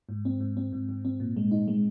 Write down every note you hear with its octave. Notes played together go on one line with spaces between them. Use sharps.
G#2
C4
G#2
C4
G#2
G#2
C4
A#2
G#3
D#4
G#3